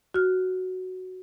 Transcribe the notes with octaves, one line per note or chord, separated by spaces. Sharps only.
F#4 F6